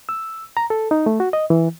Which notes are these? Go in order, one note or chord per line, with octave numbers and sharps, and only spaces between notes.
E6
A#5
A4
D#4
A3
F#4
D#5
E3